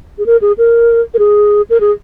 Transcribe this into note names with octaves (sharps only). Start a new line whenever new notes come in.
G#4
A#4
G#4
A#4
A#4
G#4
A#4
G#4